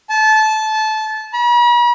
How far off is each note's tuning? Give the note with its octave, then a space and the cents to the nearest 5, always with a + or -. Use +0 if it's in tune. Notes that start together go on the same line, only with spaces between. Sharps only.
A5 -20
B5 -45